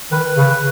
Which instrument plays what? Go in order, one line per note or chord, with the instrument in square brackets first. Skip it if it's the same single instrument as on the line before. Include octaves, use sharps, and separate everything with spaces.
[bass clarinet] D#3 [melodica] B4
[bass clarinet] C#3
[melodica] B4